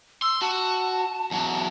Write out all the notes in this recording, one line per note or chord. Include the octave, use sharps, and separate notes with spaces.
C6 E6
F#4 A5
E2 F#3